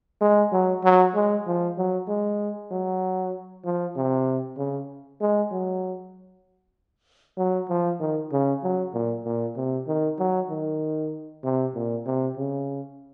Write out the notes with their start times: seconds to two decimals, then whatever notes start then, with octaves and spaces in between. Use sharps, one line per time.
0.21 G#3
0.52 F#3
0.84 F#3
1.15 G#3
1.47 F3
1.77 F#3
2.08 G#3
2.71 F#3
3.65 F3
3.96 C3
4.58 C#3
5.21 G#3
5.52 F#3
7.38 F#3
7.69 F3
8.00 D#3
8.32 C#3
8.63 F#3
8.94 A#2
9.25 A#2
9.56 C3
9.87 D#3
10.19 F#3
10.50 D#3
11.44 C3
11.74 A#2
12.06 C3
12.37 C#3